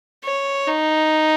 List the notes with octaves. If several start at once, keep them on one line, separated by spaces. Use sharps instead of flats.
C#5
D#4